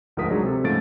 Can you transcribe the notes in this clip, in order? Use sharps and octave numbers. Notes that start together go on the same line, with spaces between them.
D2 G#2 F3 A#4 D#6 B6
F#3 G#3 D4 D#4 G#4
C3 A4
G#2 C#3 F3 A3 A6 D7